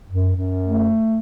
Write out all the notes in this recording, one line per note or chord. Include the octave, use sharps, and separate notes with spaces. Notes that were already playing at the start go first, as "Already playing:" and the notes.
F#2
F#2
A3